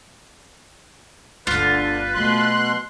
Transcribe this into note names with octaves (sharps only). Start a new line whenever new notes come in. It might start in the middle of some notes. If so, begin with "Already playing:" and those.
G1 D2 D3 F4 B4
B2 F#3 A3 C6 F#6